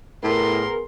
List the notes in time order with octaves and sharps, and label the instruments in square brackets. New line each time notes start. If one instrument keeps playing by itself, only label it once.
[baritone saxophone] A2 [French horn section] B3 G#4 A#4 [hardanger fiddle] C6